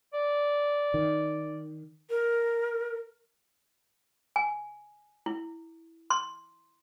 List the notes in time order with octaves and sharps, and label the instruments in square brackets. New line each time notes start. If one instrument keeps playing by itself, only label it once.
[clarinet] D5
[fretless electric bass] D#3
[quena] A#4
[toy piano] G#5
E4
C6